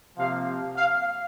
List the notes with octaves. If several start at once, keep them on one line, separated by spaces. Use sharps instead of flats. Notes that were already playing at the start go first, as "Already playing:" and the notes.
C3 F3 A#3 F5
F5